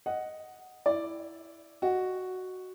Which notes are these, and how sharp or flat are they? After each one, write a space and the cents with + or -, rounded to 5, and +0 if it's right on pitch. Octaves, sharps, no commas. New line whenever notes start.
D#5 +0 F#5 +0
E4 +0 D5 +0
F#4 +0 D#5 -15